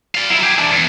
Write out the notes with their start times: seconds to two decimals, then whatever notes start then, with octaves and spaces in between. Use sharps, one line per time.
0.15 D5 F5
0.30 F#3 E4
0.43 G4 G#4
0.59 E3 D4
0.72 E2